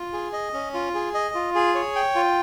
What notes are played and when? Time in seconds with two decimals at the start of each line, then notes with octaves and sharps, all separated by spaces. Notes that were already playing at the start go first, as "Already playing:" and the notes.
Already playing: F4
0.13 G#4
0.33 D#5
0.53 C#4
0.74 F4
0.95 G#4
1.14 D#5
1.35 F4
1.55 G#4
1.75 C#5
1.96 G5
2.15 F4